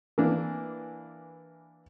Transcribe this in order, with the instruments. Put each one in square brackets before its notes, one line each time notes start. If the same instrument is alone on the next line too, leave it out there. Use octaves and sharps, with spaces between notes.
[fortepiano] E3 A#3 D4